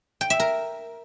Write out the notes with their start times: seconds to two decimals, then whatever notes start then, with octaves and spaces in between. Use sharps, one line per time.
0.21 G5
0.30 E5
0.40 A#4